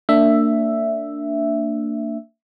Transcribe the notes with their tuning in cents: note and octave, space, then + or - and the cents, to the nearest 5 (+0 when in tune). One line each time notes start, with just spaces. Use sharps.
A#3 -35 D4 +0 E5 +5